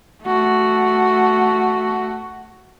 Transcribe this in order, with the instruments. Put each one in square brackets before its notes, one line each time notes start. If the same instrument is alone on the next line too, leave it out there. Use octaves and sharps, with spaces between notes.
[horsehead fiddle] A3 F#4